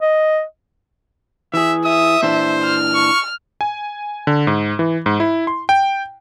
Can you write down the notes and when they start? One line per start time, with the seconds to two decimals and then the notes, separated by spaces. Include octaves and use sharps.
0.01 D#5
1.54 E3 G#4 E5
1.85 E5 D#6
2.23 A#2 E3 D4 C5
2.63 F6
2.95 C#6
3.61 G#5
4.27 D3
4.47 G#2
4.79 E3
5.06 G#2
5.20 E4
5.47 C6
5.69 G5